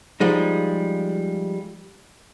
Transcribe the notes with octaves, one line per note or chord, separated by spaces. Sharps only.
F3 G3 G#3 D#4